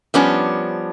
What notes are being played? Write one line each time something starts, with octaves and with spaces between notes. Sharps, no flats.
F3 G3 B3 C#4 D4